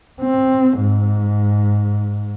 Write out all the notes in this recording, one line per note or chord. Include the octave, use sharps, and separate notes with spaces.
C4
G#2